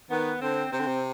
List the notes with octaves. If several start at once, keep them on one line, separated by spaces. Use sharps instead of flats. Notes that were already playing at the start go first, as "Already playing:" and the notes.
D#3 B3
D3 C4
C3 C4
D3
C3